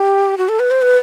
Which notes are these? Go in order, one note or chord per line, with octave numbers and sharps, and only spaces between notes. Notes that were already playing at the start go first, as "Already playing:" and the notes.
Already playing: G4
F#4
A4
B4
C5
B4